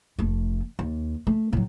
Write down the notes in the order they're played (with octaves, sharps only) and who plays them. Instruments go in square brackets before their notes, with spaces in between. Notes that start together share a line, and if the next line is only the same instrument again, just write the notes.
[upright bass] F1 A3
D#2
A3
A2 F#3